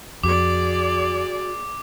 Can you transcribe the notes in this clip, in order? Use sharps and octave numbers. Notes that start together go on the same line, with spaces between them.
F2 F#4 G#4 D5 D6